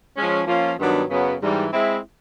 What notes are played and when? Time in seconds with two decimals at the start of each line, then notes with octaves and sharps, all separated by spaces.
0.17 F3 G#3 C#4
0.47 F3 A#3 C#4 F4
0.79 G2 D#3 F#3 B3 D4
1.09 F#2 C#3 F#3 B3
1.41 G#2 E3 G3
1.72 G#3 C4 E4